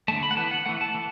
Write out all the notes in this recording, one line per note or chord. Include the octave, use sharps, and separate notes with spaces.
D3 A3 A5
B5
F#5
E3 B3 A5
F#5
E3 A3 F#5
A5
E3